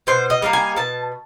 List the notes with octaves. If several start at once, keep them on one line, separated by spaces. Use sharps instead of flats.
B2 C5
D#5
G3 A#3 D#4
G#5
B2 A5